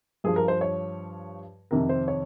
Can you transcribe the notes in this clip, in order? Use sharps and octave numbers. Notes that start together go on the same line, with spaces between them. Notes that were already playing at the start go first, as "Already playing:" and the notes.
G2 F3 G#4
A#4
C5
C#5
F2 C3 D#3 A#4
C5
C#5